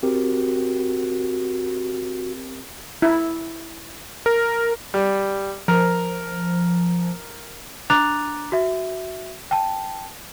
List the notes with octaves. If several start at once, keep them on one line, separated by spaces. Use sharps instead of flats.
C4 F#4 G4 A#4
E4
A#4
G3
F3 A#4
D4 A#5 D6 F#6 A6 F7
F#4 E5
G5 A5